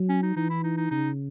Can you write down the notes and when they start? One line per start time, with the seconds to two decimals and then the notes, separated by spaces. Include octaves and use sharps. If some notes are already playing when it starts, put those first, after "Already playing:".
Already playing: F#3
0.09 C#4
0.23 D#4
0.36 E3 D#4
0.50 E4
0.63 D#4
0.77 D#4
0.91 C#3 D#4